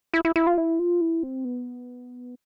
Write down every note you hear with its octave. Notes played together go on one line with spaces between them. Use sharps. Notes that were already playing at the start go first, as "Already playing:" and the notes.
E4
E4
E4
F4
E4
F4
E4
C4
B3